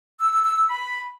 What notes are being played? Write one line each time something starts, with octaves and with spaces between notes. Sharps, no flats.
E6
E6
E6
E6
B5